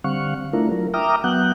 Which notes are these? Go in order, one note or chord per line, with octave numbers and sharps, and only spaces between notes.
D3 G3 C4 F5 F#5 C#6
A3 D4 E4 F4 A#4
F#3 A#4
E5 G5 A#5 D6 D#6 F6
F#3 B3 F#5 F#6 G6